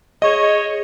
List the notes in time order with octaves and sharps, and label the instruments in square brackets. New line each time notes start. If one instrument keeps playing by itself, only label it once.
[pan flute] G#4 [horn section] C#5 [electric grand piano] D#5